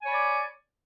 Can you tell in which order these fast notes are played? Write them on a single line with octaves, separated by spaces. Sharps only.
G#5 C#5 B5 D5 D6